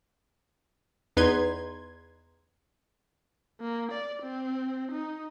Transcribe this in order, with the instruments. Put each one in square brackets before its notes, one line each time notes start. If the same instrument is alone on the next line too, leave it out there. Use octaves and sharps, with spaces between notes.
[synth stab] E2 D#4 B4 C6 G#6
[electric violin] A#3
D5
C4
D#4